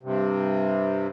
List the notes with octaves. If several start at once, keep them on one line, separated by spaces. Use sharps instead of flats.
G2 C3